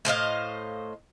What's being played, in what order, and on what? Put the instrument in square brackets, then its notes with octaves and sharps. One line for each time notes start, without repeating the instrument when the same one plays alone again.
[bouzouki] A2 C5 D#5 F5